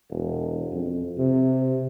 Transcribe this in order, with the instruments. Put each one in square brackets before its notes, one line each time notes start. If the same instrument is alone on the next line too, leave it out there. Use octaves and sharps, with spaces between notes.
[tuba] E1
F2
C3